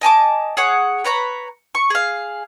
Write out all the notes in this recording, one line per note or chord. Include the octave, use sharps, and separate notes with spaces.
D#5 G#5 A5 D6
G#4 C#5 F#5
B4 C#5 A#5 B5
C#6
G#4 F5